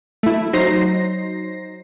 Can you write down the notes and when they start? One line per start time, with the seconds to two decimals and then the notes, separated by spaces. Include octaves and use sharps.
0.23 A3 E4
0.53 F#3 D#4 C5 A#6 C7